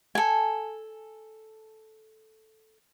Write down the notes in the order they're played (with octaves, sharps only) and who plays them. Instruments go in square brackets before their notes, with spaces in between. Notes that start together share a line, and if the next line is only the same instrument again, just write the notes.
[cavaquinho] A4 G#5